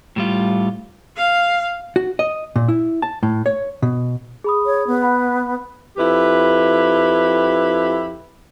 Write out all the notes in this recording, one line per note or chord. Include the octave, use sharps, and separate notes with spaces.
A2 G3 F4
F5
F#4
D#5
A#2
E4
A5
A2
C#5
B2
G#4 B5 D#6
C#5
B3
F#5 B5
F2 E4 G4 B4